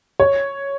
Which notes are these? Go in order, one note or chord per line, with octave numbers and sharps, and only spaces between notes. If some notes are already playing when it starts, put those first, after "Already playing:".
C#5